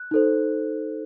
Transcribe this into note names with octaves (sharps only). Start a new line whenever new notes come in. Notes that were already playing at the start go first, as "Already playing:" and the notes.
Already playing: F#6
D#4 A4 C5